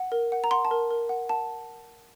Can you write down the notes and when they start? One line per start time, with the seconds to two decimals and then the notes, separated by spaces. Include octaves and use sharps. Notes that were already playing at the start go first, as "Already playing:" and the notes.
Already playing: F#5
0.12 A#4
0.32 F#5
0.44 A#5
0.51 F#5 C6
0.65 A5
0.71 A#4
0.91 A#4
1.09 F#5
1.29 F#5 A5